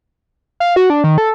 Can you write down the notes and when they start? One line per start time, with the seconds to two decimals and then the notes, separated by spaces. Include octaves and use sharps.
0.60 F5
0.76 F#4
0.90 D4
1.04 D#3
1.18 A4